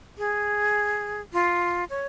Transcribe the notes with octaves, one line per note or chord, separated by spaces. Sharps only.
G#4
F4
C#5